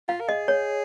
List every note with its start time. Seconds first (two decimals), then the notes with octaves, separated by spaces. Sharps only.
0.09 F4 F5
0.21 A#4
0.29 G#4 D#5
0.48 C#5